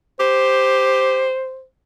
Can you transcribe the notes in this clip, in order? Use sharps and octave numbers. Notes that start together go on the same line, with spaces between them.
G4 C5